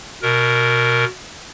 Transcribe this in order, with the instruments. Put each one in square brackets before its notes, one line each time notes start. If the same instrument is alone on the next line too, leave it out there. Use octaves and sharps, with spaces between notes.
[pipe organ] B2 A#4